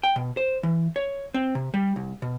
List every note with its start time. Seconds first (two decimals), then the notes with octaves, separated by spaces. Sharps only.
0.03 G5
0.16 B2
0.37 C5
0.63 E3
0.96 C#5
1.34 C4
1.55 C3
1.74 G3
1.96 C2
2.22 B2